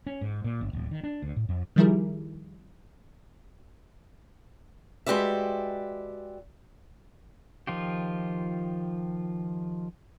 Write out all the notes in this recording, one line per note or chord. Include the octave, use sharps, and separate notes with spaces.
C#4
G#2
A#2
G1
D1
D#3
D4
D2
A2
F2
D#3 F3 G3 E4 G#4 A#4
G#3 F#4 G4 B4 D5 E5
D#3 F3 F4 G4